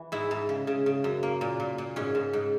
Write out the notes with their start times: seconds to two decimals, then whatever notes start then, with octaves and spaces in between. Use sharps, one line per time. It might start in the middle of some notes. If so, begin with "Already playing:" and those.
Already playing: E3
0.12 G#2 E4
0.31 G#2
0.49 C#3
0.67 C#3
0.86 C#3
1.04 F#2
1.23 A#3
1.41 A#2
1.60 A#2
1.78 A#2
1.96 G#2 C#4
2.15 G#2
2.33 G#2